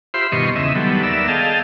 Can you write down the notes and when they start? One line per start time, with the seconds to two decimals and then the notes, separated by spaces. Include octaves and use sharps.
0.14 F4 G4 C5 E5 B5 C6
0.32 G2 B2 D#3 D#5 C6 C#6
0.55 E2 C#3 D#5 E5
0.75 D#3 F#3 G3 B3 A4
1.03 D#2 B3 A#4 D5 E5 E6
1.28 G#4 A4 D#5 F5 G5 A5